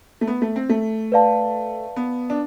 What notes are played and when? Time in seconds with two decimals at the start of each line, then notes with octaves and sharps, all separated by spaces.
0.21 A3
0.28 B3
0.42 A3
0.56 C4
0.69 A3
1.12 B4 D5 F5 A5
1.96 B3
2.30 D4